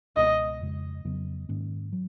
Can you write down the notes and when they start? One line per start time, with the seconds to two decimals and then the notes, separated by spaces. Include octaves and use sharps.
0.17 C#2 B2 G#3 B3 D#5
0.61 F2 C#3 G#3
1.05 F2 C#3 F#3 B3
1.49 G#2 D#3 A#3 C#4
1.92 F#3